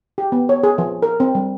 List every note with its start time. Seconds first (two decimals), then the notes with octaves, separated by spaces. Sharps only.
0.18 G4
0.32 B3
0.49 C#5
0.63 G#4
0.78 F3
1.02 A#4
1.20 C4
1.35 G3